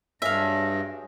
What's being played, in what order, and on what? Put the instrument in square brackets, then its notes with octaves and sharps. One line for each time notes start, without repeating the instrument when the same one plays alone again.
[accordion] G2 [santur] F#3 G#3 G#4 [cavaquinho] E5 F5 [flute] A#6